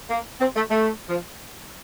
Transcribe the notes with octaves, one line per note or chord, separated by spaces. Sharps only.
A#3
C4
A3
A3
F3